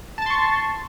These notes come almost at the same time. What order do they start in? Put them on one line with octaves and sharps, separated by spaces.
A5 A6 C6 C#6